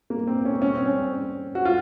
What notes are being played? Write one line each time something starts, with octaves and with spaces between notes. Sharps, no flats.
A#3
C4
C#4
C#4
C4
C#4
F#4
F4